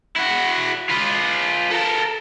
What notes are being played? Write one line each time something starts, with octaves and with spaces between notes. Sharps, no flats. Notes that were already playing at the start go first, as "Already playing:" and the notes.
E4 F#4
F4 B4
A4 A#4